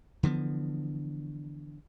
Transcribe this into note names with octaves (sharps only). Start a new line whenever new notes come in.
D3 E3 F3 B3